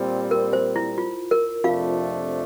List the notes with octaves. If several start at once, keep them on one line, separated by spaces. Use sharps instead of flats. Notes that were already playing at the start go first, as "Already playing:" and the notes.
Already playing: A#2 G3 C4
A#4
C5
E4
F4
A#4
F2 C3 F3 A3 D4 F4 F5